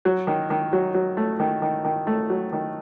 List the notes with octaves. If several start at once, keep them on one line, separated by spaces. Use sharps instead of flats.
F#3
D#3
D#3
F#3
F#3
A3
D#3
D#3
D#3
A3
F#3
D#3